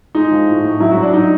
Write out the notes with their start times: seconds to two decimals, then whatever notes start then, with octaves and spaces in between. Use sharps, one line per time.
0.15 G#3 D#4
0.31 F3
0.47 A2
0.64 A2
0.80 F#3 E4
0.91 F#4
0.97 F#3
1.03 D4
1.13 F#3 D#4